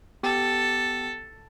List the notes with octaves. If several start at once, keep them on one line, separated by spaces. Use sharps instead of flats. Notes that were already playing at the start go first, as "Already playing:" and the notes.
B3 G4 A4 G5